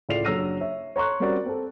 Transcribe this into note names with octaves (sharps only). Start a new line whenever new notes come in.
C#2 A2 F4 D5 C7 F7
F#1 F#3 D4 E6 A#6 D#7
C#5 E5
C#5 A#5 C6 C#6 F#6
G3 C4 C#4 F#4 A#4 D5
C4 A4